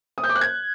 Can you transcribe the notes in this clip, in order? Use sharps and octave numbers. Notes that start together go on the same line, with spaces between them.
D#6
G6
D6
F#6
G#6